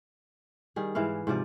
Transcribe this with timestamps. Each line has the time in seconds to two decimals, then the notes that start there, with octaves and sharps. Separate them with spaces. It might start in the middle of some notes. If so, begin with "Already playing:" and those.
0.76 D#3 G3 G#4
0.95 G#2 E3 E4 F5
1.27 G#2 C3 F3 D5